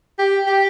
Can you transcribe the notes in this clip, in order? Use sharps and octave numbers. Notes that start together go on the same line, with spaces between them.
G4
G4